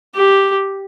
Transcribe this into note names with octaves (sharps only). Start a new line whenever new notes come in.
G4